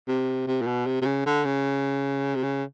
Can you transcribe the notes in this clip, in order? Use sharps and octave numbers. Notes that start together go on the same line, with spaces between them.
C3
C3
A#2
B2
C3
C3
C#3
D3
C#3
C3
C#3